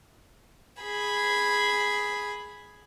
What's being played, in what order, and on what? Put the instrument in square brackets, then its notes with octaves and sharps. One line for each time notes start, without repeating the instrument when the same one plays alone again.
[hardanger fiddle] G#4 B5